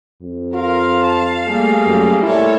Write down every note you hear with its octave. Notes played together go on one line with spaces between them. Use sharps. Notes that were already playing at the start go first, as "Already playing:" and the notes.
F2
F4 A#4 F5
A5
G3 A3 A#3 G#4
F#2
A#2 E4 A4 C#5